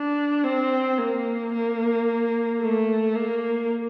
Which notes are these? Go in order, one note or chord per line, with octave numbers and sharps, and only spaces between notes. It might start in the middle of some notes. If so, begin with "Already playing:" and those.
Already playing: D4
C4
A#3
A#3
A3
A#3